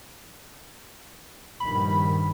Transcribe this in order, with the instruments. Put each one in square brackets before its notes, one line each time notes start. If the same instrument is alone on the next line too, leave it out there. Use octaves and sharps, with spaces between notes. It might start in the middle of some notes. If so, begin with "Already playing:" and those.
[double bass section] A#1 G2 D#3 [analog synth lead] B5